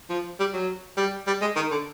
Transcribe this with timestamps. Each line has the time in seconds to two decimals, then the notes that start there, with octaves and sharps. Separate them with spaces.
0.10 F3
0.40 G3
0.53 F#3
0.97 G3
1.27 G3
1.42 G#3
1.56 D#3
1.71 D3